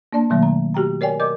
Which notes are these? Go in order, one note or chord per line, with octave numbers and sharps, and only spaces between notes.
A#3 D4 D5 A5
B2 D#3 F#3 A3 A#3
A#5
F#4 G4 G5 A#5
A#4 C#5 D5 G5 G#5
A#4 D5 D#5 D6 G6